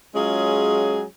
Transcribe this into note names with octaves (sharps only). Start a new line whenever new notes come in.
F#3 G#3 C#4 F4 G#4